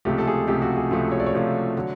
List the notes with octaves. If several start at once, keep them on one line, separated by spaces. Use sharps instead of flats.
C#2 C3 F3 A3 G4
A4
G#4
C#2 C3 F3 A3 G4
F#4
G#4
C#2 C3 F3 A3
C#5
D5
C#5
C#2 C3 F3 A3
D3 F#3